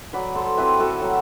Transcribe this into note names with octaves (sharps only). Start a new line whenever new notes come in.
F#3 B4 D5
A4 C5
C4 E4 G4 B4
F#4 A4
F#3